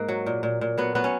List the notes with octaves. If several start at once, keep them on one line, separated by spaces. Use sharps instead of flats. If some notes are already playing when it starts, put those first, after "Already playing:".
Already playing: G#2 A#3
F#3
A#2
A#2
A#2
F#3 B3
F#3 B3
C#4